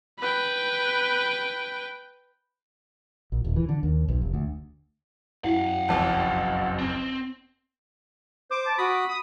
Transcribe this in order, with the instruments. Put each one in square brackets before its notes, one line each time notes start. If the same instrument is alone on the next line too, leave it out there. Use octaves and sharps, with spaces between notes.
[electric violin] B4 G5
[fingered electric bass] A#1
D#1
E3
D3
D#2
B1
F1
D2
[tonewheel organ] F#2 [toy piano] E4 [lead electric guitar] F5 F#5
[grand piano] F#1 B1 F2 [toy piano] G#4 C#5 A5
[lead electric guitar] C4
[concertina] C5 [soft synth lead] D6
[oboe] A5
[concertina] F#4 D#6 [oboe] B5
[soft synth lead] D#6